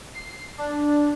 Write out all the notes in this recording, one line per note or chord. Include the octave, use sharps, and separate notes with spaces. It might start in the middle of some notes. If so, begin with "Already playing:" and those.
C7
D4